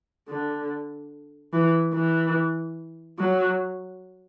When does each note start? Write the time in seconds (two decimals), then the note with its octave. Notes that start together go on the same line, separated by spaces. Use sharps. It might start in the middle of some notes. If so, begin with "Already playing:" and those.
0.29 D3
1.53 E3
1.94 E3
3.19 F#3